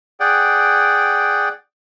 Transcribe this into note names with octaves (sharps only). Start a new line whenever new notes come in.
G#4 D5 F#5 G5